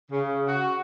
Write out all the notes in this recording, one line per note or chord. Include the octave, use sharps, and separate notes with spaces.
C#3
F#4